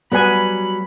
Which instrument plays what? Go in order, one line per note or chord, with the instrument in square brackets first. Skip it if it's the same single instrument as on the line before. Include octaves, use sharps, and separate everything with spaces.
[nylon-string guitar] F#3 G3 [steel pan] B3 B4 G#5 [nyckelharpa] B5